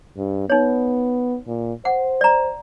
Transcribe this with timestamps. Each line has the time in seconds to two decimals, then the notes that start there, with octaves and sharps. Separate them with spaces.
0.17 G2
0.50 B3 D#4 C#5
1.48 A#2
1.85 C5 F#5
2.21 D5 A#5